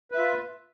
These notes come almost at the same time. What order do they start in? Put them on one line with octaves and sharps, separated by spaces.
B4 E5 F4